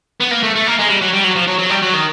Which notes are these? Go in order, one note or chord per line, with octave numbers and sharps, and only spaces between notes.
B3
A#3
A3
A3
A#3
G#3
G3
F#3
G3
F#3
F3
F#3
F#3
G3
F#3
D#3